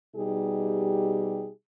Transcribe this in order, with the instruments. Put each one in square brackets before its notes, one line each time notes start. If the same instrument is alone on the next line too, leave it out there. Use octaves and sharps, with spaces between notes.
[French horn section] B2 G3 D#4 G4 G#4